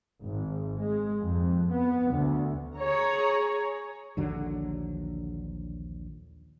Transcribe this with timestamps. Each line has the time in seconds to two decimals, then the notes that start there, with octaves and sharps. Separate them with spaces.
0.21 G#1
0.81 G#3
1.22 F2
1.73 B3
2.14 D2
2.77 G#4 C#5 A#5
4.17 A#1 D#2 D3 F#3